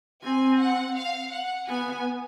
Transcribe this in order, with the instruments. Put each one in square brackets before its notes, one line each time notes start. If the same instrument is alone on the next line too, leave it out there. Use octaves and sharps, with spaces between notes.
[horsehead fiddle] C4 [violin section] G#5
[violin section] F#5
F5
F#5
[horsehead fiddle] B3 [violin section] G#5